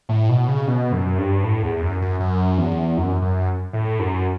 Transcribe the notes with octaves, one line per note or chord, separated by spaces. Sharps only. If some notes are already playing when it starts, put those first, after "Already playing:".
A2
B2
C#3
B2
F#2
G2
A2
E2
F#2
F#2
F#2
E2
F#2
F#2
A2
F#2